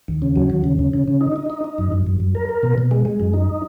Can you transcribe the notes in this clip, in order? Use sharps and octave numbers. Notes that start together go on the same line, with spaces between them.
D#2
C#3
F#3
D#2
C#3
C#3
C#3
C#3
D#4
D#4
D#4
D#4
F#2
F#2
F#2
F#2
A#4
A#4
B2
B2
G#3
G#3
F#2
D#4